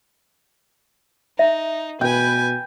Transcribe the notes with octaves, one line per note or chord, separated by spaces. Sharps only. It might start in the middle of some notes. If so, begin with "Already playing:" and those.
D#4 E5
B2 B4 G5 G#5